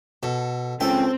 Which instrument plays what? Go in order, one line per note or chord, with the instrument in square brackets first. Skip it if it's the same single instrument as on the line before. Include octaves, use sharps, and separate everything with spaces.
[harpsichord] B2 [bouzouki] A4
[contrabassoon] C#2 [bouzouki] A3 G5 G#5 [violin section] C4 [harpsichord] A4